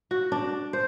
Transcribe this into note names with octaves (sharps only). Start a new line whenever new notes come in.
F#4
D4
C5